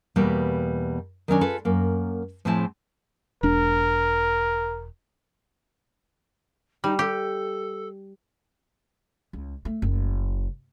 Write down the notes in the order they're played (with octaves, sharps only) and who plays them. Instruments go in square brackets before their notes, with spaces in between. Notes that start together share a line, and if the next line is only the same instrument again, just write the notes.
[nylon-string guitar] E2 B2 G3 A#3 B4
D#3 F#3 C#4 D4
F4 G#4 A4 B4
F#2 A#3
A2 F3 C4 E4 G#4 A5
[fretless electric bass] E1 D4 [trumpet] A#4
[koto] G3 [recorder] D#4
[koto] G4 [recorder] A4
[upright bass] C#2
A3
F#1